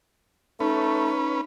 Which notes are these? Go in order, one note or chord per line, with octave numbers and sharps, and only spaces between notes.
A3 C#4 D#4 B4